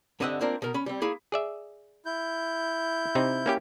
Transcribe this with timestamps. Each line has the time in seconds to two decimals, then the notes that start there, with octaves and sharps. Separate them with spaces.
0.20 G2 D3 C4 D#5 E5 F#5
0.41 A#3 C4 D4 F4 A#4
0.62 B2 A#4
0.74 C#4 B5
0.86 G3 C4
1.02 A#3 E4 G#4
1.32 G#4 D5 E5
2.06 E4 G6
3.15 C3 C4 D#4
3.46 A#3 C#4 G4